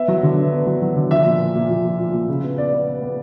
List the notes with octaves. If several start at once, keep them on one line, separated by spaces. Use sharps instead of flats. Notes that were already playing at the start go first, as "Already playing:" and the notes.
Already playing: B3 E5
F#3
D3
B3
B3
F#3
F#3
D3
F3 E5
A#2
A#2
A#2
F3
A#2
A#2
A#2
C#3
B3
B3 D5
B3
B3
B3